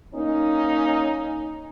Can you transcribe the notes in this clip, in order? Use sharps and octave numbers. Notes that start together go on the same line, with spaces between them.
A#3 C#4 D#4